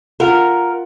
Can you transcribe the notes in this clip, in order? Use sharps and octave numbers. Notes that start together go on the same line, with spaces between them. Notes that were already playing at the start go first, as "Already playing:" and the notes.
F4 A#4 F#5